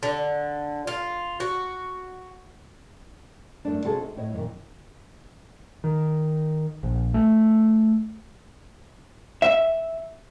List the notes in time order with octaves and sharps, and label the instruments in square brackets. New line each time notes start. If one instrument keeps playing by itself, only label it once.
[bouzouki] D3
F4
F#4
[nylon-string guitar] F#2 A3 D4
C3 G#3 D4 F#4 G#4 A4
D#4
A2 E4 C#5 D#5
F#2 A#2 D3 D#3
[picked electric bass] D#3
A#1
A3
[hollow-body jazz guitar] E5